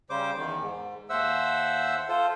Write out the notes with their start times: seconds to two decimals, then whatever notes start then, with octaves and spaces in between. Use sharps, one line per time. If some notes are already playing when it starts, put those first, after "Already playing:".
0.10 C#3 G3 C5 D6
0.37 E2 D#3
0.61 G#2
1.10 D#2 C5 E5 F#5 E6
2.08 F4 A4 C5